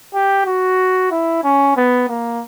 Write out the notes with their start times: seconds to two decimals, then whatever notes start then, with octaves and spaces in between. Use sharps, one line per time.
0.14 G4
0.46 F#4
1.11 E4
1.44 C#4
1.77 B3
2.09 A#3